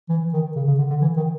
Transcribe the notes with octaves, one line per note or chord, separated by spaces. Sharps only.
E3
D#3
C#3
C#3
D3
D3
E3
D#3